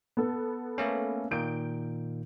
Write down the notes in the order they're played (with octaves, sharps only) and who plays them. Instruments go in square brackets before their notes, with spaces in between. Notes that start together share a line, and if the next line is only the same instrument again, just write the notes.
[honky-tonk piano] B3 A4
[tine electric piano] A3 A#3 C#4
[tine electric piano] A#2 D#3 [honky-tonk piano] G6 D7